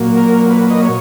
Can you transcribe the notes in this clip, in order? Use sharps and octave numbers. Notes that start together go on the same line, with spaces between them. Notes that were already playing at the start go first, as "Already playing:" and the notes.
Already playing: A#2 F#3 A#3
A#4
B4
D#5
C#5